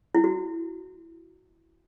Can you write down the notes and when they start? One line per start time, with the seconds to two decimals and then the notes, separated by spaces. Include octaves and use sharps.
0.15 E4
0.24 F#4